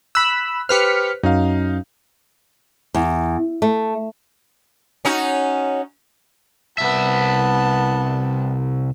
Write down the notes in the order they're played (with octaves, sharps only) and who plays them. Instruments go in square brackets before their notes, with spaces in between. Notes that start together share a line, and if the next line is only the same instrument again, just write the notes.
[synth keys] B5 E6 [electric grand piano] F#6
[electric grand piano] G4 B4 C5 [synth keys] F6 B6 C#7
[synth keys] F#2 [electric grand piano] D#4 F5
[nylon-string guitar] E2
A3
[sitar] C#4 D#4 F#4
[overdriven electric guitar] C2 E5 [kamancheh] B3 A5